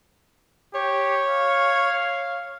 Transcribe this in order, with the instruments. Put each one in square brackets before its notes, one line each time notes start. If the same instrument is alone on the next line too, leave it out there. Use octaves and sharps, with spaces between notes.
[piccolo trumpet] G4 [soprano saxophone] C#5
[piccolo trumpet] F5